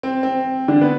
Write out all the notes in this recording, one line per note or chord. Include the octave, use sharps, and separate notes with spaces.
C4
C4
D3 D4
B3 B4